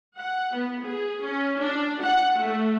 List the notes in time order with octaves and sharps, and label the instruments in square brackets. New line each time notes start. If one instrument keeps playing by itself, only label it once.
[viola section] F#5
B3
G#4
C#4
D4
F#5
A3